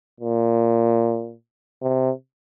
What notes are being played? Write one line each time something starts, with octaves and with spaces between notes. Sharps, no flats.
A#2
C3